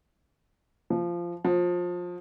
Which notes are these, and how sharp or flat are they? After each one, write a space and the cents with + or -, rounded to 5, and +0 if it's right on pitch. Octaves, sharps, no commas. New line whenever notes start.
F3 -15
F3 +20